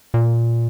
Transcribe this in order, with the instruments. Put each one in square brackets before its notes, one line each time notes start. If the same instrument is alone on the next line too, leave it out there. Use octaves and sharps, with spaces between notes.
[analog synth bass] A#2